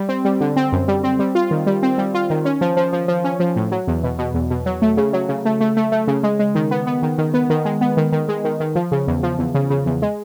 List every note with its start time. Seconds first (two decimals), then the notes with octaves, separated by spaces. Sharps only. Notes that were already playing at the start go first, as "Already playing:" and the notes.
Already playing: G3
0.09 C4
0.25 G3
0.41 D3
0.56 C4
0.72 F#2
0.88 G3
1.04 C4
1.19 G3
1.35 F4
1.51 D#3
1.67 G3
1.83 C4
1.98 G3
2.14 F4
2.30 D#3
2.45 C#4
2.61 F3
2.77 F3
2.93 F3
3.08 F3
3.24 C#4
3.40 F3
3.56 A2
3.71 F#3
3.87 E2
4.03 B2
4.19 B2
4.34 E2
4.50 B2
4.66 F#3
4.82 A3
4.97 C#3
5.13 F#3
5.29 C#3
5.45 A3
5.61 A3
5.77 A3
5.92 A3
6.08 C#3
6.23 G#3
6.39 G#3
6.55 D#3
6.71 B3
6.87 B3
7.03 D#3
7.18 D#3
7.34 B3
7.50 D#3
7.65 G#3
7.81 B3
7.97 D#3
8.12 D#3
8.29 G#3
8.45 D#3
8.60 D#3
8.75 F3
8.92 C#3
9.07 E2
9.23 F3
9.39 E2
9.55 C#3
9.70 C#3
9.86 E2
10.02 G#3